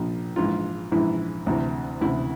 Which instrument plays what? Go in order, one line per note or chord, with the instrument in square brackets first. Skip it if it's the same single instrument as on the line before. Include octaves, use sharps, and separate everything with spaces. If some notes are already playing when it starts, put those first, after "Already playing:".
Already playing: [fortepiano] A#1 A#2 F3
A#1 G#2 E3 F4
A#1 G#2 E3 E4
D2 C3 E3
D2 C3 E3 E4